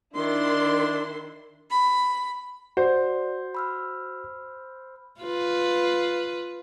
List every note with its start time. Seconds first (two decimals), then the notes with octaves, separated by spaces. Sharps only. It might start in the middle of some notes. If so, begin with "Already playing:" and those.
0.14 D#3 D4 E4 C6
1.71 B5
2.77 F#4 C5 D5
3.55 B5 E6 F6
5.21 F4 B4